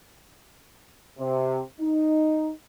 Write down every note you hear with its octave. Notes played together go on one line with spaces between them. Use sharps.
C3
D#4